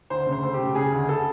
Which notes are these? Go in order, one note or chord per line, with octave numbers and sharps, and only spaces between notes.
D2 C5
C#3
C5
A3
G4
C#3
C#3 G#4
D2
A4